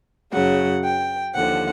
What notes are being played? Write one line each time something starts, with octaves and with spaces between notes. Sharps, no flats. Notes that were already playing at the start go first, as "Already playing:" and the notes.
F#2 C#3 F#3 F#5
G5
D#2 D3 F3 F#5